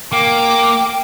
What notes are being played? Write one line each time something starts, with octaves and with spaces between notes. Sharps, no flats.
A#3 G5 D6